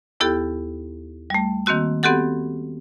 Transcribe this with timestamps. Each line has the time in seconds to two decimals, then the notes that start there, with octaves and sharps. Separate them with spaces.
0.20 D#2 B3 E4 G4 A4 G5
1.30 G3 A3
1.66 D#3 A#3 C4 F#4 E6
2.03 B3 C4 F#4 G4 A4 F#5